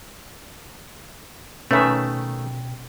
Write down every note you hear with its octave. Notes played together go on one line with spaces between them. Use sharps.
B2 D#3 A3 C#4 B4 E5 G5